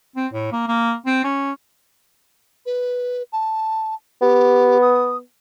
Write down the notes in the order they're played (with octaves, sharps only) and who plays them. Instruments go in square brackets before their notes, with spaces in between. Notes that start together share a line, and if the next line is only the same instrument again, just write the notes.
[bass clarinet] C4
A2
A#3
A#3
C4
C#4
[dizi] B4
A5
[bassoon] B3 [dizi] G4
[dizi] D#6